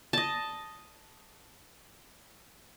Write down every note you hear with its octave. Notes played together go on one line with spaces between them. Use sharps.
D#5 A5